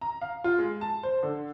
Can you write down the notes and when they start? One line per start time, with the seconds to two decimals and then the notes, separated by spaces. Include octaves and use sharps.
0.01 A#5
0.21 F5
0.44 F4
0.59 G#3
0.81 A5
1.03 C5
1.23 D3